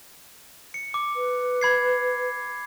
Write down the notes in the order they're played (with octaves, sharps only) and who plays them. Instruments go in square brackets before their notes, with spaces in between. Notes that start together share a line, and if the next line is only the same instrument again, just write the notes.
[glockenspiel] C#7
D6
[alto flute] B4
[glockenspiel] B5 G#6 C7